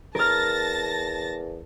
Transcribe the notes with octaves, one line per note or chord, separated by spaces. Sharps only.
E2 A#4 A5 F6 A6 A#6